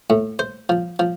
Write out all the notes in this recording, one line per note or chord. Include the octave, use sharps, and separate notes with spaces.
A2
C5
F3
F3